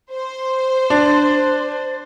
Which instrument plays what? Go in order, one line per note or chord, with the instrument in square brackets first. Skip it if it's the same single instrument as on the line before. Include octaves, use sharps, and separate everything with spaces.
[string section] C5
[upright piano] D4